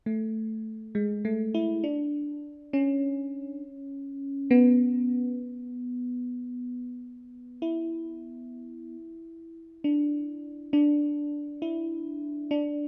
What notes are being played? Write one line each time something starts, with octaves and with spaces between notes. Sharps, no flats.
A3
G#3
A3
E4
D4
C#4
B3
E4
D4
D4
E4
D4